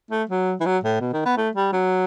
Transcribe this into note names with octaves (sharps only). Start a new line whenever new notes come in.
A3
F#3
E3
F#3
A2
B2
D#3
B3
A3
G3
F#3